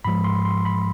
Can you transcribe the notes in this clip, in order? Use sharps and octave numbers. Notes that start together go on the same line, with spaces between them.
G#2 F3 G#3 B5
C6
C6
B5